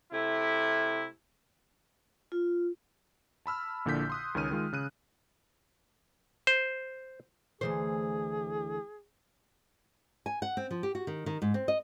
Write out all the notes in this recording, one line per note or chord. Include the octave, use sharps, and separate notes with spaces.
C3 A3 E4
F4
A5 B5 E6 F6
A#1 A#2 D3 E4 G6 B6
C6 D#6 F#6
C#2 D#3 C#4 F6 D#7
D#3 G#3 F4
C#3 F#6 D#7
C5
D2 E3 G#4 C5
G#5
F#5
C4
F3
G4
F#4
D#3
D#3
G#2
C4
D#5